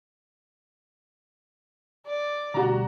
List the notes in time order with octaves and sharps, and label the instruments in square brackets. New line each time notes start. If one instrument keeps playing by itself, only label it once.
[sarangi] D5
[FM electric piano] D2 B2 G3 [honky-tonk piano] F#4 A#5